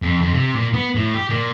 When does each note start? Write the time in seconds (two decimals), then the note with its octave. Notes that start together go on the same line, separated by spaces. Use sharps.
0.02 F2
0.22 F2
0.33 C3
0.56 A#2
0.73 B3
0.95 A2
1.14 G4
1.30 A#2